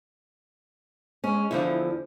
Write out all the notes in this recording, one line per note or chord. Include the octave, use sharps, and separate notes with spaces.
G#3 C#4
E2 D3 F3 E4